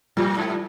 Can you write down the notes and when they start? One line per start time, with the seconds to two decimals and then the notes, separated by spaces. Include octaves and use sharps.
0.17 A2 F3 G3
0.37 G#2